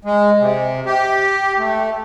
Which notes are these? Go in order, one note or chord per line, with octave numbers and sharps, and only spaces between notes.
G#3
C3
G4
A3